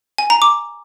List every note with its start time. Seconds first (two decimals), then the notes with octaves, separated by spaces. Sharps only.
0.18 G#5
0.30 A#5
0.42 D6